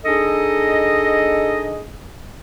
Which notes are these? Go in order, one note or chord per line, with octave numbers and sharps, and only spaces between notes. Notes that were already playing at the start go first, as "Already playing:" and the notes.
D4 D#4 G#4 A4 D#5